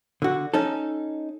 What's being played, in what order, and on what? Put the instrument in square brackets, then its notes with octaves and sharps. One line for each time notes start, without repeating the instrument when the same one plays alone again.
[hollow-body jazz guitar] D3 F#4
C#4 D#4 A4